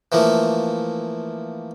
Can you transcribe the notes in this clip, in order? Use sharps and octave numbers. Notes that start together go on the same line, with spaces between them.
E3 F3 A3 A#3